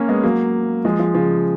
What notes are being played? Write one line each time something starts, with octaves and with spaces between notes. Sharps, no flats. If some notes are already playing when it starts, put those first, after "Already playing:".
Already playing: A#3 C#4
G#3 B3
F#3 A#3
F3 G#3
F3 G#3
C#3 F3